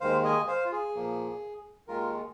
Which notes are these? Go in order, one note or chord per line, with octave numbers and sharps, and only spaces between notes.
D#2 D#3 G#3 C5 F5
D#5 G#5
C5 F5
F4
G#4
A#2 F3 A#3
D#2 D#3 G#3 F4 A#4